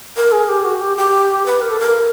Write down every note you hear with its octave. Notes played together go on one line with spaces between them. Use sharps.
A#4
G#4
G4
F#4
G4
G4
B4
A#4
A4
A#4